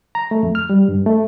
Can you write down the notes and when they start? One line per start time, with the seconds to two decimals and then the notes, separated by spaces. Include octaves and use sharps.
0.15 A#5
0.31 A3
0.43 F2
0.55 F6
0.70 G3
0.89 G2
1.06 A3